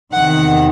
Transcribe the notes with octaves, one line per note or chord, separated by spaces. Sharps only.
E2 C3 D#3 F#5